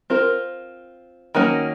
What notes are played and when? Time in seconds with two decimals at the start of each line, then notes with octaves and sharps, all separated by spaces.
0.10 C4 F4 A#4
1.35 D#3 F#3 A#3 C#4